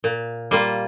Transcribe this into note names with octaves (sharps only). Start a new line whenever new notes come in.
A#2
G3 A#3 F4